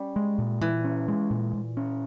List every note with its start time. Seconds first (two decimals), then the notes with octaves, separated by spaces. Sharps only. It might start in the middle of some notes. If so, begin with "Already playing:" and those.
Already playing: G3 C#4
0.16 G#3
0.38 A#2
0.61 A#2 E3
0.84 C#4
1.08 G#3
1.30 A#2
1.53 A#2
1.77 C#4